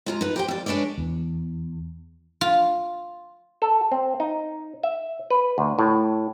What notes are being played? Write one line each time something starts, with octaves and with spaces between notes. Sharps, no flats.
G#3 F4 A#5
D#4 B4
G4 C5 G5
F2 D5
G#3 D4 B4 C#5 D5
E2
F4
A4
C4
D#4
E5
B4
D2
A2